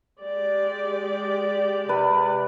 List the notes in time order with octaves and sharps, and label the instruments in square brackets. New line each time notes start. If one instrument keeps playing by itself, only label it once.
[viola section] G#3 G4 D5
[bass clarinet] C3 [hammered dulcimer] B4